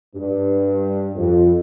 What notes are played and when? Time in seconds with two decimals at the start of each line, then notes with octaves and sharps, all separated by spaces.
0.15 G2
1.15 F2